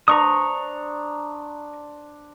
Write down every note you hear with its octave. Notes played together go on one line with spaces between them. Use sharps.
D4 C5 A#5 C#6 D#6